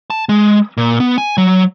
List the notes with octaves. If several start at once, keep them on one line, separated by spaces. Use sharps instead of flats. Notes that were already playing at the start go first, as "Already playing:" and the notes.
A5
G#3
A#2
B3
G#5
F#3